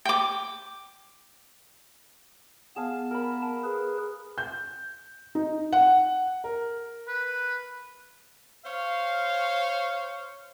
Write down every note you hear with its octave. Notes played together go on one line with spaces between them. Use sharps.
G5 D6
B3 G#4 F5 A5
A#4 B5
G#4 B4
G6
D#4
F#5
A#4
B4
C5 C#5 F5